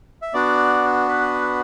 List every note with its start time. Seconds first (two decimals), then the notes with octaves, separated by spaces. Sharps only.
0.22 E5
0.34 B3 D4 F#4 D5
1.08 B4